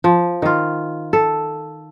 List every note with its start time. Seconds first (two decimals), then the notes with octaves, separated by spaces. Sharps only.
0.04 F3
0.42 D#3 F4
1.13 A4